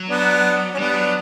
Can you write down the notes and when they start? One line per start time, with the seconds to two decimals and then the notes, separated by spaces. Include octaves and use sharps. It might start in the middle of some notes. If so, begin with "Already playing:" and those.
Already playing: F#3
0.09 B3 D4
0.75 C#4
0.78 G3 B3 D4
0.96 F#3